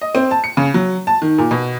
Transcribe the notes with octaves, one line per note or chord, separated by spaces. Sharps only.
D#5
C4
A5
C#7
C#3
F#3
A5
D#3
A#2
B2